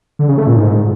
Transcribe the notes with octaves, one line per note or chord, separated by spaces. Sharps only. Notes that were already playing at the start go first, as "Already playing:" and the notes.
D3
C#3
A3
A#2
G#2